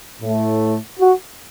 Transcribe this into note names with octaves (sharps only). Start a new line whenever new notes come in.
A2 A3
F#4